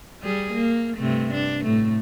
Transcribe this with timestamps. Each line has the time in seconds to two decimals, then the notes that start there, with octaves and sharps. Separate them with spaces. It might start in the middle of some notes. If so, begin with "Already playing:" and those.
0.22 G3 G#4
0.53 A#3
0.98 G2 C3 A3
1.34 D4
1.64 A2 A3